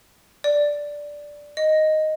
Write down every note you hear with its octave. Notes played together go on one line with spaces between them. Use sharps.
D5
D#5